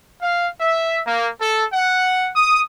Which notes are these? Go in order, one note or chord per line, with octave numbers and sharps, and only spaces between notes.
F5
E5
A#3
A4
F#5
D#6